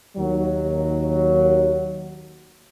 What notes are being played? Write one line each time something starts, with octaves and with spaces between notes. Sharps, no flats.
D#2 F#3